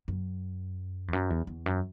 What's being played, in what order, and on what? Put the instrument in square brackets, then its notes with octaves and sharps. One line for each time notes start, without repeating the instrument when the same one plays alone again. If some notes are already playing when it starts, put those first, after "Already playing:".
[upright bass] F#2
E2
F#2
E2
E2
F#2